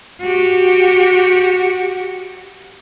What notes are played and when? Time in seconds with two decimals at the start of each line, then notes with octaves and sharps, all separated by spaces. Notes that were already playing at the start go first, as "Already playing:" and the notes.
0.22 F#4 G4